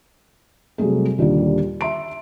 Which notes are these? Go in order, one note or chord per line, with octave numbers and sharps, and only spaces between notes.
C3 F#3 G3 A3 G#4
D#2 A#2 D3 G3
E5 C6 D7